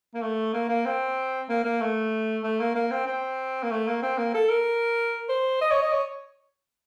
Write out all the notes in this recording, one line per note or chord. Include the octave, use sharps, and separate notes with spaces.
A#3
A3
A#3
A#3
C4
A#3
A#3
A3
A3
A#3
A#3
C4
C4
A#3
A3
A#3
C4
A#3
A4
A#4
C5
D#5
C#5
D#5
C#5